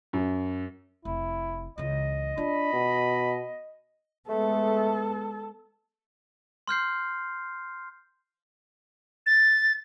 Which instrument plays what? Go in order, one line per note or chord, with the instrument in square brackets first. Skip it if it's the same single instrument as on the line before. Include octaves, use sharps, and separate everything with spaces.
[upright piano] F#2
[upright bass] F1 [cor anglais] E4
[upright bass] C#2 E3 [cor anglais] D#5
[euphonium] D4 [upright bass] F4 [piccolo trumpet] B5
[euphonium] B2
[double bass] G#3 B3 [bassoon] A3 [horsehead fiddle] A4
[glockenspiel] C6 F6 G6 C7
[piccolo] A6